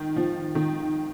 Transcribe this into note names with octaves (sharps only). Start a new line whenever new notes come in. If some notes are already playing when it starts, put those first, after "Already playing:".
Already playing: D#3
F3
D#3